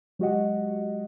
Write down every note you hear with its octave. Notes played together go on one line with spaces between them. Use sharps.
F#3 G#3 F#4 G4 D#5 F#5